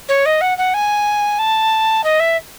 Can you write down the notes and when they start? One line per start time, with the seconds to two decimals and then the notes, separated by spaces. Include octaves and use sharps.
0.08 C#5
0.25 D#5
0.41 F#5
0.57 F#5
0.73 G#5
1.38 A5
2.03 D#5
2.19 E5